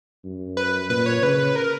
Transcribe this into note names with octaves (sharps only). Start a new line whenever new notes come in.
F#2
B4
A#2 B4
C#5
C#3 B4
A#4